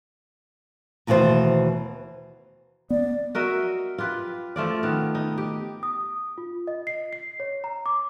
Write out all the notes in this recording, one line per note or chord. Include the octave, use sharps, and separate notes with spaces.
D#2 B2 E3 A3 C5
B3 D5
F#4 A#4 D#5 E5
F4 G4 B4
F3 A3 F4 D5
D#3 B3
D#4
G4
D#6
F4
D#5
C7
C7
C#5
A#5
D6